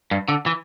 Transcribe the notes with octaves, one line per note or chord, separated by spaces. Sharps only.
G2
D3
E3